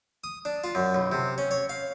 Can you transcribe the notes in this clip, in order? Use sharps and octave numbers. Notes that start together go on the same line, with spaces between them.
D#6
D4
F4
F#2
B1
C3
C#4
C#5
F5